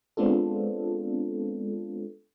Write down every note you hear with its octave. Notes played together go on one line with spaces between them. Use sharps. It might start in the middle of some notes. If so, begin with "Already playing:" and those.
G#3 B3 C4 D4 F4 A4